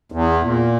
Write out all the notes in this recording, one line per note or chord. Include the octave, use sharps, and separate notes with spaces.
E2
A#2